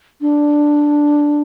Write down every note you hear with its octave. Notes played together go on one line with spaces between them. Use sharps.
D4